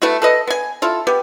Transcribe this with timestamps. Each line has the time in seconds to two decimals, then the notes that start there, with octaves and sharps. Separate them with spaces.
0.02 A3 B3 E4 F#4
0.22 A4 B4 D#5
0.47 B3 G#5
0.82 E4 F4 A4
1.07 B3 G4